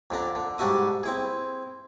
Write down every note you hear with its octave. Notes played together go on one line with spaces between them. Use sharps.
F2 D3 D4 A#5
D3
G#2 G3 D4 F#4 E5 D#6
C4 E4 G#4